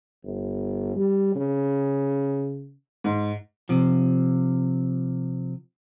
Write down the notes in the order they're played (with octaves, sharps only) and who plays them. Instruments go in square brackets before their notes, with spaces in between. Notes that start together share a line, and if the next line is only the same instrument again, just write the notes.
[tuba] G1
G3
C#3
[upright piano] G#2
[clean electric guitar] C3 F3